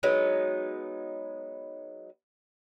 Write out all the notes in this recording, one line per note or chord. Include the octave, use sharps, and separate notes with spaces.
F#3 G#3 B3 D#4